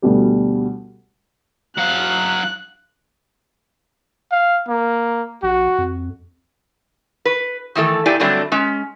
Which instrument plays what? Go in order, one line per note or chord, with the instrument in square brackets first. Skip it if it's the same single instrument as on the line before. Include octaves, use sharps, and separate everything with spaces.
[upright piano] D2 B2 G3
[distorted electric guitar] F#3 F5 [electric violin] F#6
[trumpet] F5
A#3
[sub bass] A#1 [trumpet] F#4
[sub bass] F2
[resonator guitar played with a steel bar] B4
D#3 E3 A3 A4
A#2 A3 E4 G4 D5 G#5
D3 F#3 G3 A3 C4 D4
G#3 C#4